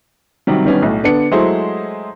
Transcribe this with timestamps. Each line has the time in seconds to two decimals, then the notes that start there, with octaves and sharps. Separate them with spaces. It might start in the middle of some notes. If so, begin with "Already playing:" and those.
0.47 C3 D#3 F#3 G3
0.65 D#3 G3 B3 C#4 D4
0.82 B1 A2
1.03 D3 B3 D4 C#7
1.31 F#3 G#3 A3 E4 G#4 C5